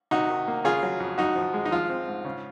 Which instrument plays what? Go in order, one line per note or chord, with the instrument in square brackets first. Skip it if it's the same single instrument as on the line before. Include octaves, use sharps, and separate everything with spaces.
[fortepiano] C3 D#4 F#4
D#3
A#3
C#3 F4 G#4
F#3
F2
F#2 D#4 F#4
F3
G#3
D#4
F3 F4
C4
G#2
C#3